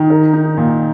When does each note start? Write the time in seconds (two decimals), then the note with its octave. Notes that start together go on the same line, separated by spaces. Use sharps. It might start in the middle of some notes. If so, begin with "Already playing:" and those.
Already playing: D#3
0.10 A#4
0.33 D#4
0.57 A#2